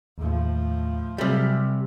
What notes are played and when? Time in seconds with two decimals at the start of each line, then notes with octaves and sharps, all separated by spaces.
0.18 D#2 A2 F3
1.18 C3 F#3 G3 G#4 F6